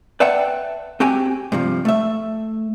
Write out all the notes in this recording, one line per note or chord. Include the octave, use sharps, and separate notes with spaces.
B4 D5 E5 F#5 G5 A5
C4 F#4 G4 G5 G#5
G2 C3 F3
A3 E5